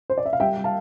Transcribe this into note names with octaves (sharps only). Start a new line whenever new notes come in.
C5
D5
E5
F5
G3 E5 G5
G3
F5 A5